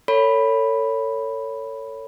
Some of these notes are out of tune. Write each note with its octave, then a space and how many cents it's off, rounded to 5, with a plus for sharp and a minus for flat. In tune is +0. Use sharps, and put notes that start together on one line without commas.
A4 +35 C#5 +10 B5 +0